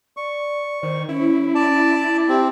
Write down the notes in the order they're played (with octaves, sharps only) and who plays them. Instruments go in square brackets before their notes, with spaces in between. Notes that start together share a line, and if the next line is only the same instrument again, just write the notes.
[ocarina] D5 [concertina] C#6
[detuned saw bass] D#3 [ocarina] C5
[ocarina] C#4 [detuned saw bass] E4
[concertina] D5 A5
[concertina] C4 [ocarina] G4